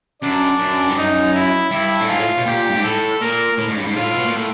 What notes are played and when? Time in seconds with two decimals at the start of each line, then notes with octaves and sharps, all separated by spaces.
0.22 F#2 D4
0.59 F#2
0.89 G2
0.97 F#2 D#4
1.34 E4
1.71 G2 E4
2.00 A2
2.08 G#2 F4
2.18 A2
2.37 B2
2.46 A#2 G4
2.70 G2
2.76 G#2
2.83 A2 A4
3.21 A#2 A#4
3.58 A2
3.68 G#2
3.77 G2
3.87 G#2
3.95 A2 F4
4.14 B2
4.25 A#2
4.36 A2